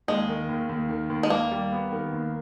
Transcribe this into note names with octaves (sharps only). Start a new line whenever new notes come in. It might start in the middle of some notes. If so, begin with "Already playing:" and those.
D#2 G#3
D#3
D#2
D#2
D#3
D#2
G#3
D#2 A#3
G3
B3
D#3
D#2